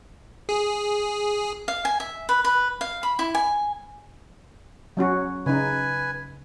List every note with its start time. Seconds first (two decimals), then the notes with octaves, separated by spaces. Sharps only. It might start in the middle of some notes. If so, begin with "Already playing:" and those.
0.49 G#4
1.68 F5
1.85 G#5
2.00 E5
2.29 B4
2.45 B4
2.81 F5
3.03 B5
3.19 E4
3.35 G#5
4.97 F#3 C#4 F#4
5.46 C#3 D#4 B4 G#5